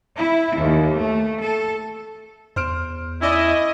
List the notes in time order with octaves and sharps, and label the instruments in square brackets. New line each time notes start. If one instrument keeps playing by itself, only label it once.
[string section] E4
D#2
A3
A4
[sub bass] E2 [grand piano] C5 F6 D7
[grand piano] C#4 D5 [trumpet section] E4 [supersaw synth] D#5